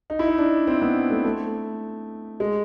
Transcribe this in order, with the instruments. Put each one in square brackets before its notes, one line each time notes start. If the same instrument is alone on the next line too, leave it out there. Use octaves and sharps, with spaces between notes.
[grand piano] D#4
E4
D#4
D4
C4
B3
A3
A3
G#3